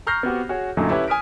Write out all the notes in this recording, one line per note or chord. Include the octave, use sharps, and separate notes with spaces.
A#5 C#6 F6 G6 A#6 C7
B3 C4 F#4 G4
F#4 G#4 C#5
F#2 A#2 D3 F#3 A3 D#4
C#4 E4 G4 A4 B4 C#5
G#5 D#6 F6 B6 D7